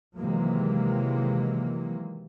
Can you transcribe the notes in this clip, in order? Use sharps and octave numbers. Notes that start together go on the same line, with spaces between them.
C3 D#3 E3 F#3 G#3 A#3